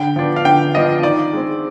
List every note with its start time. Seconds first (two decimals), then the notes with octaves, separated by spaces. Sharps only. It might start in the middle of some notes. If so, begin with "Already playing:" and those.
Already playing: D3 G5
0.16 F3 B3 D4
0.36 F5
0.45 D3 G5
0.74 F3 B3 D4 D#5
1.03 D#3 D5
1.33 G#3 C4